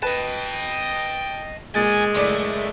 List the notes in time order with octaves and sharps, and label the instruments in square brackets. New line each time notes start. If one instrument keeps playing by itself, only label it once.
[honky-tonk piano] B4 [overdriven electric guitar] D#5 A5 [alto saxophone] G5
[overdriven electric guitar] B1 G#5 [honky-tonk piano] A#2 A6 [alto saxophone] G#3
[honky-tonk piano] F#1 A2 D5 [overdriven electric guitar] A3
[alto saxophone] G#3